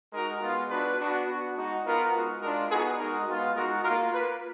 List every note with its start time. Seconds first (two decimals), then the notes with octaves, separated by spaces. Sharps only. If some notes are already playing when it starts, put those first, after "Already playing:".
0.13 G#3 D#4 F#4 A#4
0.41 G#3 B3 F4
0.70 B3 D4 F#4 B4
0.99 B3 D4 F#4
1.28 B3 D4 F#4
1.56 G#3 D#4 F#4
1.85 B3 F4 A#4
2.13 G#3 D#4 F#4
2.41 G#3 D4 F4 A#4
2.70 B3 D#4 F#4 G#4
2.98 G#3 D#4 F#4 A#4
3.26 G#3 B3 F4
3.55 G#3 D#4 F#4 A#4
3.83 F4 A#4
3.89 A#3
4.12 A#3 F4 B4